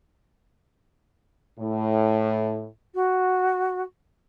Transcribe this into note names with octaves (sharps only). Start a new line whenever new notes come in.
A2
F#4